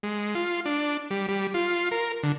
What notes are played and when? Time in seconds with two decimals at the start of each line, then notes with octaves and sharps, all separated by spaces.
0.03 G#3
0.35 F4
0.66 D4
1.11 G3
1.28 G3
1.54 F4
1.91 A#4
2.23 D3